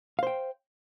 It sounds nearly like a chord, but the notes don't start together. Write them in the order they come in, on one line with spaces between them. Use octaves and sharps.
F5 C5 G5